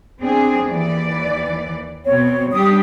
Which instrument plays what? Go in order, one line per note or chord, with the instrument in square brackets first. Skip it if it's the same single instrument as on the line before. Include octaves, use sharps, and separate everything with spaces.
[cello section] C4 D4 G#4
D#2 E3 D5
[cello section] B2 C4 [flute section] C#5
[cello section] G3 D4 G4 [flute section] D#6